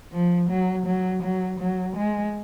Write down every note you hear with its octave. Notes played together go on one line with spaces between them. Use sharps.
F3
F#3
F#3
F#3
F#3
G#3